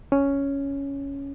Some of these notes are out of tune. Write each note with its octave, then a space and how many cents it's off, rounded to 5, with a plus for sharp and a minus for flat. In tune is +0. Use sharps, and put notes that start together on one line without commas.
C#4 +5